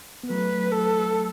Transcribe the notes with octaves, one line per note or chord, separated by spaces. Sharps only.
B3
F#3 A3 B4
A4